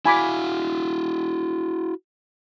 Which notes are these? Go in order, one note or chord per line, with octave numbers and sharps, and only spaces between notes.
E4 F#4 F5 G#5 B5 D6